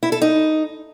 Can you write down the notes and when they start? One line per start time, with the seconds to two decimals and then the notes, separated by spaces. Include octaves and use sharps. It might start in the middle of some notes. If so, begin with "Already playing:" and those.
0.03 E4
0.12 A4
0.22 D#4